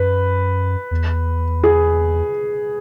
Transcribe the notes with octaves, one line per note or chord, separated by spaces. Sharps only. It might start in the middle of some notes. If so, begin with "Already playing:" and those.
Already playing: F#2 B4
E2
G#4